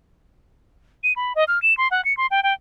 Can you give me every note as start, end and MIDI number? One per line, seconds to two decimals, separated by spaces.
1.03 1.13 99
1.16 1.33 83
1.35 1.44 75
1.48 1.61 89
1.62 1.76 100
1.77 1.88 84
1.91 2.04 78
2.05 2.16 97
2.17 2.27 84
2.31 2.40 79
2.43 2.53 79